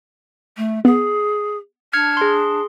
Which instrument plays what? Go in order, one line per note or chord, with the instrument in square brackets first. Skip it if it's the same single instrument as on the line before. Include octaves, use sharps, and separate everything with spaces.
[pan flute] A3
[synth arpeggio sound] B3 [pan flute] G#4
[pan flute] D4 [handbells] F6 G#6 C#7
[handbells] G#4 C6